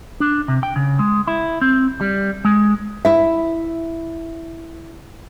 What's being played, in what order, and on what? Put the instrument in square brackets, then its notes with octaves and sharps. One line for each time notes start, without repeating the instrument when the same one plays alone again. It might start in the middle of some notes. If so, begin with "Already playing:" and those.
[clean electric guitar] D4
C3
G5
C#3
G#3
E4
C4
G3
G#3
[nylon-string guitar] E4 E5